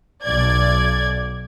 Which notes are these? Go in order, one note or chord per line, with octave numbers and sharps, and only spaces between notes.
B1 D5 G#6